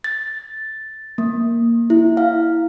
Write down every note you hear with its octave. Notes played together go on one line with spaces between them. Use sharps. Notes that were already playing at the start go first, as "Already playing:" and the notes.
A6
A#3
E4
F5